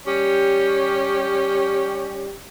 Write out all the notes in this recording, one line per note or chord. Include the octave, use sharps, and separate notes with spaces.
G3 C#4 G4